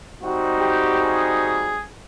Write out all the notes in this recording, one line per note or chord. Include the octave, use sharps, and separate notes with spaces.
G3 C4 D#4 F#4
G4
G#4